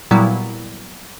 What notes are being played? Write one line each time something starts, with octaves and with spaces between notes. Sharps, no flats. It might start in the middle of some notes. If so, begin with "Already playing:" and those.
A#2 F#3 G3 B3 E4